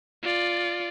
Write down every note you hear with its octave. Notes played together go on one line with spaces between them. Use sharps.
F4 D5